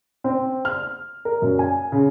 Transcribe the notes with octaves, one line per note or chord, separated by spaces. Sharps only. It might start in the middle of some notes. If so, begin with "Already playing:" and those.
C4
F6
A#4
F#2
G#5
C#3